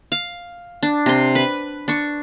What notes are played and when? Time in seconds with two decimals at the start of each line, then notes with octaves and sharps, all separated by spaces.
0.12 F5
0.83 D4
1.06 C3 C6
1.35 B4
1.88 D4 C#6